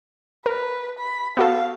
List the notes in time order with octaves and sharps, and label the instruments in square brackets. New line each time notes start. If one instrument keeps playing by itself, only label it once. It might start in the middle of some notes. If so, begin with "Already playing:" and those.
[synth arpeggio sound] A#4 [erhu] B4
[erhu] B5
[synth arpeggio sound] B3 F#4 A4 [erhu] F5